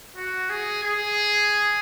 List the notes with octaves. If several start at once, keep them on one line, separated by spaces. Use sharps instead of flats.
F#4
G#4
G#4